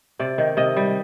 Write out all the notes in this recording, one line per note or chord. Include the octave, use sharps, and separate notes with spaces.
C3 D5
D#3
C3 D#5
G3